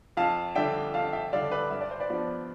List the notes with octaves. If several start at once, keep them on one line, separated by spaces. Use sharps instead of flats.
F2 F5 A5
D3 G3 D4 E5 G5
F2 F5 A5
E5 G5
D3 G3 D4 D5 F5
B4 D5
G2 E5
D5
C5
B4 D5
F3 B3 D4